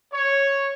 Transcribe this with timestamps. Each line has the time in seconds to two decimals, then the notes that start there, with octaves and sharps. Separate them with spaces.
0.13 C#5